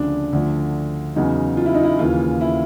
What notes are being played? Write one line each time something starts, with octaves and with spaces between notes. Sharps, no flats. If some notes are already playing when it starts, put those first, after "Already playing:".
Already playing: D2 C#3 F3 D4
D2 D3 F3
E2 C#3 F#3 D#4
F4
E4
D#4
E4
D#2 C#3 E3 F4
E4